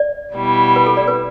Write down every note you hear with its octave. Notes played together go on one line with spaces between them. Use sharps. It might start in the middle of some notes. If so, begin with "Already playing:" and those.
Already playing: D5
B2 G3 E4
B4
A4
D5
B4